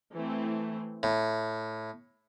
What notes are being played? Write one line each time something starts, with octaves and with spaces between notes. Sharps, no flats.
E3 A3 C4
A2